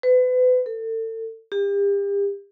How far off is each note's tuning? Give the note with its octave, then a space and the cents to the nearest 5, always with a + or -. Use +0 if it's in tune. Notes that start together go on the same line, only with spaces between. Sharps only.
B4 +35
A4 +35
G4 +35